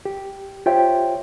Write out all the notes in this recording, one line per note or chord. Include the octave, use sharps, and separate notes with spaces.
G4
F4 G4 C5 C#5 E5 G5